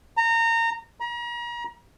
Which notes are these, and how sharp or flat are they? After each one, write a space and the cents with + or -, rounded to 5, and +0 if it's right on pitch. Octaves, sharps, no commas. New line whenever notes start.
A#5 -25
A#5 +40